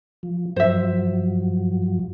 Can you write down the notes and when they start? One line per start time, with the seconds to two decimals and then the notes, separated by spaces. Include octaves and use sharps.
0.23 F3
0.56 G2 F3 F#3 C5 E5